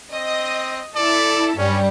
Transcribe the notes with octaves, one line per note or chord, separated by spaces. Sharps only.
C4 D#5
E4 A4 D5
G2 G3 C#4